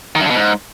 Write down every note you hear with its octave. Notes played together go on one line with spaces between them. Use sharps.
D#3
F#2
D3
B2
G#2